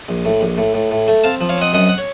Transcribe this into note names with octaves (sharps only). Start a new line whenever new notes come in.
A#1
A2
A#1
A2
A2
A2
A3
C4 F5 A5
F3
C#5 F5
C4 D#5 F#5
F#2 D#5 F#5
F#5
C#5